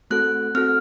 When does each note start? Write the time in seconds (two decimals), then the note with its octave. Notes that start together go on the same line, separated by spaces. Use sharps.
0.10 A3 C4 F#4 A4 F#6
0.55 C4 F#4 A4 F6